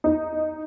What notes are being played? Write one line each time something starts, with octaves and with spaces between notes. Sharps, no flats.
D#4